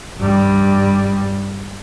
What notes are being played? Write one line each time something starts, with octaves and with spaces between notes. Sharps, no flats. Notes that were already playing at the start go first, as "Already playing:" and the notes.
G2 G3